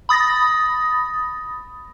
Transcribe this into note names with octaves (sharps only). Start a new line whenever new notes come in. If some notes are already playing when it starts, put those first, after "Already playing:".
B5 D#6 A6 A#6